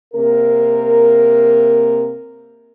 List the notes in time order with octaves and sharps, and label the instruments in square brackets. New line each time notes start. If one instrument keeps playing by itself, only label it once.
[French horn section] C3 A#3 A#4